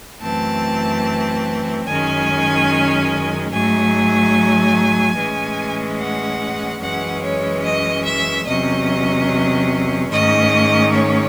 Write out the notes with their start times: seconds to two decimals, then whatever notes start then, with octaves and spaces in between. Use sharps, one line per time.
0.21 F#2 E3 A3 C4 A5
1.86 F#2 D#3 G#3 C#4 G#5
3.51 G#2 F#3 A3 G#5
5.16 A2 E3 G#3 C#4
5.99 F#5
6.81 F#2 E3 G#3 C#4 F#5
7.22 C#5
7.64 D#5
8.05 E5
8.46 E2 C3 F#3 C#4 D#5
10.11 G#2 D#3 A3 C#4 D#5
10.93 C#5